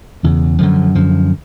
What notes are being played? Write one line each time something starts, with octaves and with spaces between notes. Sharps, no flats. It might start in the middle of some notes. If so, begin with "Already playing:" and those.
E1 E2 C#3
F#2 D3 F3
F#2 D3 F3